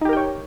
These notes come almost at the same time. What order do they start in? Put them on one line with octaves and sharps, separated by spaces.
D#4 G4 A#4 G5 C#5